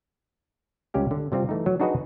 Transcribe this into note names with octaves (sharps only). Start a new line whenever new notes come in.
C#2 G3 C#4 G4 F5
D3
C3 G3 C4 F4
E3 A3 D#4
F#3
D4 D#4 F#4 G#4 B4 D#5